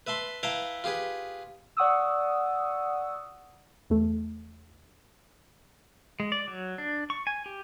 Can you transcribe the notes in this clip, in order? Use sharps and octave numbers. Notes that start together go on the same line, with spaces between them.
B4 E5 A5 C6
E4 B4 F5 G5 A5 A#5
F4 G4 G#4 B4
D5 F#5 C#6 D#6 E6
E2 A3
G#3
D5
F#3
D4
C#6
G#5
G4